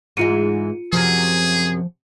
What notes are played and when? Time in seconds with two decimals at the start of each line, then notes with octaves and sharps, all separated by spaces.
0.17 G#2 E3 G#3 F4 C#7 D#7
0.93 F#2 C3 F3 G#4